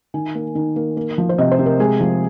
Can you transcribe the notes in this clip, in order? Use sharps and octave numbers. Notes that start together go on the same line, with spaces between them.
D#3 G#5
A#3
D#3
A#3
A#3
F3
C5
C3 D#5
C5
C3
A#4
G#3 G#4
F3